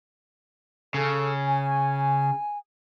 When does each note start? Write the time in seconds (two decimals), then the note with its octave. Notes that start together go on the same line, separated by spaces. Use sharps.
0.94 C#3 A4
1.47 G#5